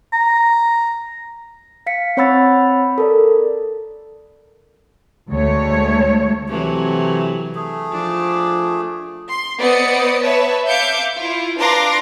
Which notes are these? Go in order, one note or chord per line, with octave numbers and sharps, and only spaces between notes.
A#5
F5 B6 C#7
C4 C#5 F#5 B5 E6 A6
A4 A#4 D5
D2 G#3 A3 C#5
C3 E3 F#3 A3
A3 G#4
F3 D4
C6
B3 C5 D5 D#5 D#6 C#7
B4 C#5 E5 A5
E5 F5 D6 G6 C#7
E4 F4
D4 B4 F5 A#5 C6 D6